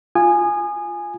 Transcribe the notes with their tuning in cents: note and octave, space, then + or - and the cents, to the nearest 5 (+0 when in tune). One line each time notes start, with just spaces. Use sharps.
F4 +0 G#5 +0 D#6 -30